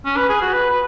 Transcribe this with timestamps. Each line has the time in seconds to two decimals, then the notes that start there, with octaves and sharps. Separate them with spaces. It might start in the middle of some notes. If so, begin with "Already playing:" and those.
0.05 C#4
0.17 B4
0.29 G#4
0.42 F#4
0.54 B4
0.70 B4